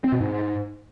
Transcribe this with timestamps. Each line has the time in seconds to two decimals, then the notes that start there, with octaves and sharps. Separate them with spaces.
0.04 C4
0.12 B2
0.21 G#2